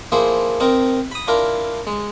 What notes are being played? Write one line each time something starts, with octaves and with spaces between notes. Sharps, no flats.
F3 A#3 E4 G#4 C5
C4 D#4 A#4
B5 D#6
D4 E4 F4 A#4
G#3